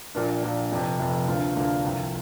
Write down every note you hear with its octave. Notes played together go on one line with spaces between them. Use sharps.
A#1 A#2 A#3 D4
A#1 A#2 A#3 D4
F1 F2 C3
F1 F2 C3
D2 D3 A#3 F4
D2 D3 A#3 F4
C2 C3 F3